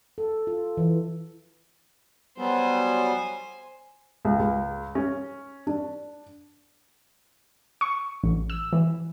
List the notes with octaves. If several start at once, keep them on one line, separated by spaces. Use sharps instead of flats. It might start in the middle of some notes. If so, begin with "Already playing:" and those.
A4
F4
E3
F#3 G3 B3 C5 G#5
C#2
C#2
C#4
D4
C#6
A1
E6
E3